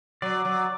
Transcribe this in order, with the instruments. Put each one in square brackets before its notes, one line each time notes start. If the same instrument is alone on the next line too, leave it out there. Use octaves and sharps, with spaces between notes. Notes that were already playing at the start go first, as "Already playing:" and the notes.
[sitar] F#3 [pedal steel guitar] D5
[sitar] F#3